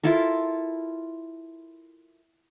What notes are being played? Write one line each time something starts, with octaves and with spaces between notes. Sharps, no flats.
E4 F4 A4 A#4